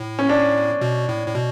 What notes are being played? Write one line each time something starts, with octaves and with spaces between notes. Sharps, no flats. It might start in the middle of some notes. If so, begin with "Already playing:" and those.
Already playing: A2
C#4
D4
B2
A2
A2
B2